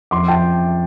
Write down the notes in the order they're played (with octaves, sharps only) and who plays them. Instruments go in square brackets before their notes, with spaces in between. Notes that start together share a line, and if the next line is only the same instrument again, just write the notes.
[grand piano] F2 C6 D6
F2 G5 A5